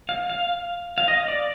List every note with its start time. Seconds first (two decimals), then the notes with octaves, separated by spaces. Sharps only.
0.09 F5
0.30 F5
0.98 F5
1.08 D#5
1.28 D5